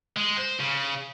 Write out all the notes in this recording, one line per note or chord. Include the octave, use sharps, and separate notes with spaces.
G#3
C5
C#3